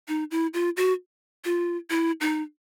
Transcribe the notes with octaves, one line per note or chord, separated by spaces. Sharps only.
D#4
E4
F4
F#4
F4
E4
D#4